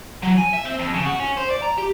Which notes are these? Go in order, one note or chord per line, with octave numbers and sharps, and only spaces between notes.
F#3
G#5
E5
C4
F2
C#3
F#4
C#4
C5
D5
A#5
G4